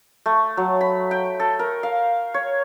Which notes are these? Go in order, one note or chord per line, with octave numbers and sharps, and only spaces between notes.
A3
F#3
B5
G5
A4
A#4
F5
C#5